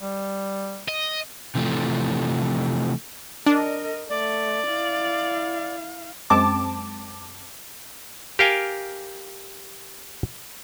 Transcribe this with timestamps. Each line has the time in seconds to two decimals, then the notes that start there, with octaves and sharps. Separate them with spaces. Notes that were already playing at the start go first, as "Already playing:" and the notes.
0.01 G3
0.88 D#5
1.55 C3 E3 F3 A3
3.46 D4 A#4 D#5
4.09 A3 D5
4.68 E4 F5
6.30 F#2 G#3 C4 A5 D6
8.39 G4 A#4 F5 G5 G#5